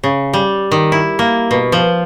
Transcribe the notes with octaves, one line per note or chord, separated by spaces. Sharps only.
C#3
G3
D#3
E4
A#3
B2
F3